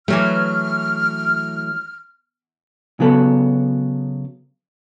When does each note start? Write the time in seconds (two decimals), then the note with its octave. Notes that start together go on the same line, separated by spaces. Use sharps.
0.08 E3 F#3 A3 F6
3.00 C#3 F#3 B3 A4